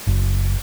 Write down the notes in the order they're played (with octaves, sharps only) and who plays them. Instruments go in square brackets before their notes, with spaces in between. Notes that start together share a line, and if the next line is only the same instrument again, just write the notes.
[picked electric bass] F#1